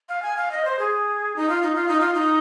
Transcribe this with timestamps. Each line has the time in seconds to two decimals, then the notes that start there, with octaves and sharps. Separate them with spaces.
0.09 F5
0.22 G#5
0.37 F5
0.52 D#5
0.65 C5
0.79 G#4
1.36 D#4
1.49 F4
1.63 D#4
1.75 F4
1.88 D#4
2.01 F4
2.14 D#4